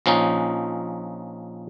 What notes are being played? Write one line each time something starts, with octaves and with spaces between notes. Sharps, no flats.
A#1 F3 C#4 D#4